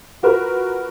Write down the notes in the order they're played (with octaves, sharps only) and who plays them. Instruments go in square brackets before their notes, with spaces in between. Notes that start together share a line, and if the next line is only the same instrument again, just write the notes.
[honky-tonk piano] F4 F#4 A#4 B4